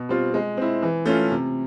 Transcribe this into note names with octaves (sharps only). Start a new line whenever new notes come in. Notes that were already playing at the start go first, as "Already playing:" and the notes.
Already playing: B2
G3 C4 F4
G#3
C4 E4
E3
A3 C#4 F4
C3